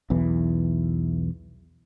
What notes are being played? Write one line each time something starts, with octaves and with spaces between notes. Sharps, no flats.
B1 E2 E3